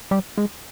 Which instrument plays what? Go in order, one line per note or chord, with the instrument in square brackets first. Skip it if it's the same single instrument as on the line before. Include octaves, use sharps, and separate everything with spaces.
[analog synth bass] G3
G#3